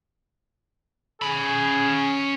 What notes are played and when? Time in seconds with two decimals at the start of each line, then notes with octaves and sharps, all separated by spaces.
1.22 C#4 G#4 B5